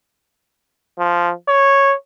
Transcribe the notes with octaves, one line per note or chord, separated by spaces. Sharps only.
F3
C#5